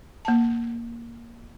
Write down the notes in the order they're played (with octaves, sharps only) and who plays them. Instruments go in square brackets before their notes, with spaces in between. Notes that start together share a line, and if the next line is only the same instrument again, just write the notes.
[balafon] A#3 A5